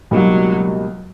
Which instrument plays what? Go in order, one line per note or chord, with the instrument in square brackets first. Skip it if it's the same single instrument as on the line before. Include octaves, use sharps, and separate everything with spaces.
[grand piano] C#2 B2 G3 A#3 D#4 [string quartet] F#3